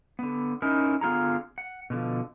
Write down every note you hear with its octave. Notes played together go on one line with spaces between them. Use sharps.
D3 B3
C#4 D#4 E4 A#4
D3 B3 F4 G#4 A#5
F#5
B2 D3 F3